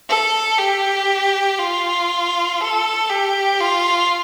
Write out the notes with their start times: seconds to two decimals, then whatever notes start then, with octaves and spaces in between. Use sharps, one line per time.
0.09 A4
0.58 G4
1.59 F4
2.60 A4
3.09 G4
3.60 F4